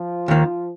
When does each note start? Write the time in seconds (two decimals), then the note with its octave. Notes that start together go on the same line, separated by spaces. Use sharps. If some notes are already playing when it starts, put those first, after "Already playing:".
Already playing: F3
0.28 D#2 D#3 A#3